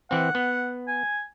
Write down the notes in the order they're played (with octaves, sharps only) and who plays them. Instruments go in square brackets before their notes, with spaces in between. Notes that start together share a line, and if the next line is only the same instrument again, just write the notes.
[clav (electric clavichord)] E3 C4 [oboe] F#5
[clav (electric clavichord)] B3
[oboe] G#5